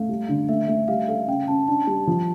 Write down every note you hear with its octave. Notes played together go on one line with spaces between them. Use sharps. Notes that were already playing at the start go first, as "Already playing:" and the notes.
Already playing: A3 F5
G3
D3
A3 E5
A3 E5
G3 F5
A4 F5
C#3 G5
C#4 A5
D4 A5
G3
F3